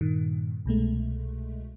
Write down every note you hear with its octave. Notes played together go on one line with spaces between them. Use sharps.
G2 A#2 D#3
C2 B2 G#3 A3